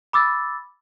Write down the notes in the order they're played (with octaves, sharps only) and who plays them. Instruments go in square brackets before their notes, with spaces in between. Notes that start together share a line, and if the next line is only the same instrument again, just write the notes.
[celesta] B5 D6 E6 A6